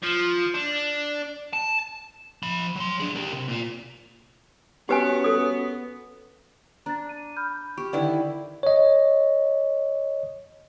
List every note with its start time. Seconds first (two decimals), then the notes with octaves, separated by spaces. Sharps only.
0.03 F3
0.54 D4
1.53 A5
2.43 F3 B5
2.76 F#3 C6
3.00 D4 G#4
3.15 G4 A#4
3.33 C3
3.48 A#2 F4
4.89 B3 C#4 F#4 G4 B4 C#5 G#5
5.24 A4 D#6
6.86 D4 A#5 A6
7.09 D#7
7.37 B5 F6 G6
7.78 G4 C#6
7.93 D3 D#3 E4 B4 D5 G5
8.63 C#5 D#5